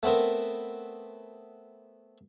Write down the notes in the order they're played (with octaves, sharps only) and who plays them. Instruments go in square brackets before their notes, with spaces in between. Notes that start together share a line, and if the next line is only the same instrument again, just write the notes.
[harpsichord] A3 B3 C4 A#4